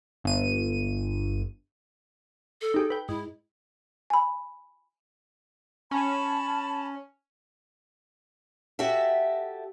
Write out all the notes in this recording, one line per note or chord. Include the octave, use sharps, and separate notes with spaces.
G1 D#7
A4
D#4 G4 G#4
B4 G5
G#2 E4
G#5 B5
C#4 A5 B5
F#4 G4 A4 E5